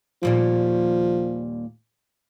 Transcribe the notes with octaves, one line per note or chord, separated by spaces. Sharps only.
D#2 A#2 F3 G3